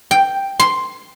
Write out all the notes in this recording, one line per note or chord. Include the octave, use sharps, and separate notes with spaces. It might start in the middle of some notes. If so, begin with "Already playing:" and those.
G5
C6